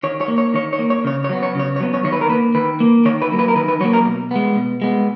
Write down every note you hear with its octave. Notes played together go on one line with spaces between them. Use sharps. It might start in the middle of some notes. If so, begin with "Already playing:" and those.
D#3 C#5
C#5
A#3
C#5
D#3 C#5
C#5
A#3
C#5
C#3 C#5
C#5
F#3 B3
C#5
C#3 C#5
C#5
F#3 B3
C#5
D#3 C#5
B4
A#4
A#3 B4
D#3 B4
A#3
D#3 C#5
B4
F#3 A#3
B4
A#4
D#3 B4
B4
F#3 A#3 C#5
A#4
B2
G#3 B3
B2
G#3 B3